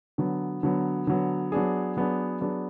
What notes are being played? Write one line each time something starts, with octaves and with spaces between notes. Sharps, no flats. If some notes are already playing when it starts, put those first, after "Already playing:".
D3 F#3 B3
D3 F#3 B3
D3 F#3 B3
F#3 B3 D4 G#4
F#3 B3 D4 G#4
F#3 B3 D4 G#4